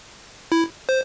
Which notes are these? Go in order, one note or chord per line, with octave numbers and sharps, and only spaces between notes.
E4
C5